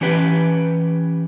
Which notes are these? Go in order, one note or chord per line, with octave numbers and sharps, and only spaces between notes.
E3 C#4 G4 B4